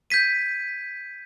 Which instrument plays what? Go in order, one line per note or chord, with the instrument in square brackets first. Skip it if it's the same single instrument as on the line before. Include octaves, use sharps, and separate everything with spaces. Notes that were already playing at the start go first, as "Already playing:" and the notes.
[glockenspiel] G6 G#6 B6 D#7